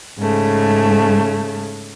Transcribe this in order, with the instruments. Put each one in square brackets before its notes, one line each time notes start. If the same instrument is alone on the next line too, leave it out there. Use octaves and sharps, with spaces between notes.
[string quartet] G#2 C#3 A3